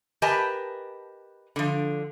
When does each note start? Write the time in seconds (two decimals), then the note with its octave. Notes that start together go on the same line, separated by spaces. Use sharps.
0.22 G4 A#4 B4 D#5 G#5 A5
1.56 D3 F3